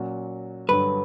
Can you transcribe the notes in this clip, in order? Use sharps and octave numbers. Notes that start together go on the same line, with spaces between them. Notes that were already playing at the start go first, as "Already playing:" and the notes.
Already playing: A#2 F#3 C#4 F#4
G2 D3 F#3 B4